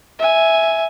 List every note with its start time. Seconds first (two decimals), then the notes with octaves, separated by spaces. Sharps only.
0.19 E5 G#5